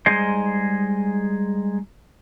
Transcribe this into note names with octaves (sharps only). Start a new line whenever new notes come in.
G3 G#3 D#4 G#4 C5 D#5